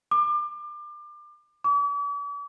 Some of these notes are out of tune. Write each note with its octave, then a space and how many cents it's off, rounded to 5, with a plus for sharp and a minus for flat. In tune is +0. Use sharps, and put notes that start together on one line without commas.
D6 +30
D6 -45